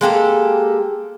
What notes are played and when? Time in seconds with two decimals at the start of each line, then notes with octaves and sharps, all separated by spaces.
0.01 G#3 A#3 G4 A4